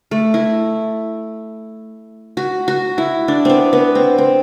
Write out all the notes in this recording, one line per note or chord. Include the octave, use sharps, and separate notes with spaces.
A3
E4
F#4
F#4
E4
D4
B3 C4
B3
C4
C4